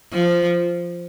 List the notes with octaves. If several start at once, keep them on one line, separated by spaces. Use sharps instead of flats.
F3